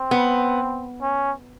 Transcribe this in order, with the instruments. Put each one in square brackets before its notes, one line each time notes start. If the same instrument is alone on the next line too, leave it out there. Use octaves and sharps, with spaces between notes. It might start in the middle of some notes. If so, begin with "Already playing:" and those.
Already playing: [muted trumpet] C4
[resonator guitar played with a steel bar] B3
[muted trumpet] C#4